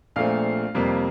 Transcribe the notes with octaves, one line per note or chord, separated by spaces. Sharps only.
A#1 A#2 A3 C4 F5
F2 C3 G3 A#3